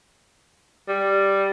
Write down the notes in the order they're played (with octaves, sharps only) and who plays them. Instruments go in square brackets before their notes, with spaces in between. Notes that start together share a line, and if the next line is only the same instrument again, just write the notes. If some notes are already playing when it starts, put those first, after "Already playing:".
[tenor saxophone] G3